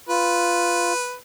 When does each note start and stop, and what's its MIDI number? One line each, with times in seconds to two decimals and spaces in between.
0.09 0.93 65
0.09 1.16 71